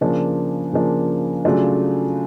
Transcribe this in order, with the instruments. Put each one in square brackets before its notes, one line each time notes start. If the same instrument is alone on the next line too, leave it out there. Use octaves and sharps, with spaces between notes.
[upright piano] C#3 F3 A#3 D4
C#3 F3 A#3 D4
C#3 F#3 A3 D4 F4